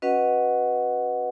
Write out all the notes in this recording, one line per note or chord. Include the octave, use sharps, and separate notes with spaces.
C#4 F#4 B4 D#5 F#5